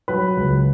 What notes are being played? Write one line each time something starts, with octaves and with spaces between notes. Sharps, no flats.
F#3 B4
C#2